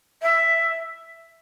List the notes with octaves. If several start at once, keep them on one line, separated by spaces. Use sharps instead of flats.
E5